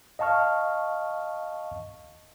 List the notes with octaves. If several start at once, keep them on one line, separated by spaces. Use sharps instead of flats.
D#5 F5 A5 C#6 F6